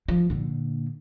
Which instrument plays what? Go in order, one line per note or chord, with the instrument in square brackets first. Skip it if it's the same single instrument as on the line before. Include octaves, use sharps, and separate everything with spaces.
[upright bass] F3
A#2 D3